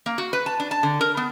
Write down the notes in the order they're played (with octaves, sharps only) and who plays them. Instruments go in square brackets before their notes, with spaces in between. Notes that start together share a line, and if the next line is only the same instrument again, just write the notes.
[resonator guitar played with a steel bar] A#3
F#4
B4
A5
D4
A5
D3
A#4
B3